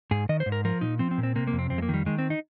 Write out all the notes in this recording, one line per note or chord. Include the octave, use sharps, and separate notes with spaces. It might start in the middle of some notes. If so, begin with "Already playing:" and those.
G#2 G#4
D#3 D#5
C5
G#2
A#4
F3 A#4
A#2 D#4
F3 C4
C4
A#2
C4
C3 A#3
A#3
F2
C4
F2 C4
G#3
A#3
D#3 G3
D#3 G#3
C4
D#4